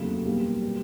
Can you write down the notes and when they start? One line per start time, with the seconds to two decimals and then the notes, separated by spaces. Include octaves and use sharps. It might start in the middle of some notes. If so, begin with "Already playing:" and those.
Already playing: F1 D#2 C#3 F#3 A3
0.25 B1 B2 G3 A#3
0.62 B2 G3